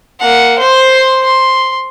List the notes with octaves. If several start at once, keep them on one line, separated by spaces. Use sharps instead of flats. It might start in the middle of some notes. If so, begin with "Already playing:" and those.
A#3 F#5
C5 C6
C6